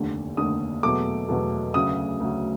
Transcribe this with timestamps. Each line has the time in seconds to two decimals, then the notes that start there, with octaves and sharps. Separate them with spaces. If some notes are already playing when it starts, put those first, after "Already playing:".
Already playing: F1 D#2 D3
0.37 F1 D#2 D3 D#6
0.83 E2 B2 F#3 A3 D6
1.29 E2 B2 F#3 A3
1.74 D2 C#3 F#3 D#6
2.20 D2 C#3 F#3